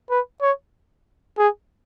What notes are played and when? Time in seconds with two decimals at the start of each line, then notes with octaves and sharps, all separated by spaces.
0.10 B4
0.42 C#5
1.38 G#4